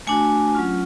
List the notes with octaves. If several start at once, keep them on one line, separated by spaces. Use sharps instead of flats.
A3 D4 F#4 G#5
F#3 C#4 F4